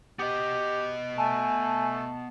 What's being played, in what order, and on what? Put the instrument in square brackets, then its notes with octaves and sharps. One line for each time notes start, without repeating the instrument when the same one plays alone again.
[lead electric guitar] B3 D#5 [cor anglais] G4
[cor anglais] A3 [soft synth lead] G#5 [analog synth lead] A5